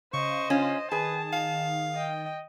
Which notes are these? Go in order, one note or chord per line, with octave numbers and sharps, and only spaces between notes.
C#3 C5 D#5 C#6
C#4 F4
D#3 G#4 B4 A5
F5
D#5 G5